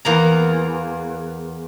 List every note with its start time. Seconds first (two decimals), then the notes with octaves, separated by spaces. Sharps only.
0.05 E2 A#3 A#5